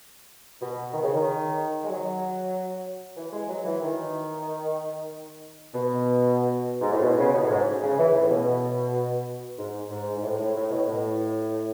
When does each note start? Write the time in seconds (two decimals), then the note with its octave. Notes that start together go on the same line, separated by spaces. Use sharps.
0.61 B2
0.93 D#3
1.03 C#3
1.14 D#3
1.84 G#3
1.88 F#3
3.17 E3
3.32 G#3
3.49 F#3
3.65 E3
3.82 D#3
5.74 B2
6.81 G#2
6.92 A2
7.01 B2
7.18 C#3
7.34 B2
7.42 A2
7.50 G#2
7.82 C#3
7.99 E3
8.14 A2
8.30 B2
9.58 G#2
9.90 G#2
10.15 G#2
10.23 A2
10.38 A2
10.55 A2
10.70 B2
10.87 A2